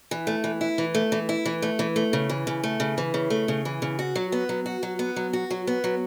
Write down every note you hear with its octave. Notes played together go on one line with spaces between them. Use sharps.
E3
A3
E3
E4
E3
A3
E3
E4
E3
A3
E3
A3
C#3
E3
C#3
A3
C#3
E3
C#3
A3
C#3
E3
C#3
F#4
F#3
B3
F#3
F#4
F#3
B3
F#3
F#4
F#3
B3
F#3